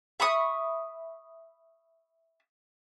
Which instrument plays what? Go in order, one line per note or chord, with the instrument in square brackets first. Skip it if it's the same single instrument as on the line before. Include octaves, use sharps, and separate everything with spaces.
[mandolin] E5 B5 C#6 D#6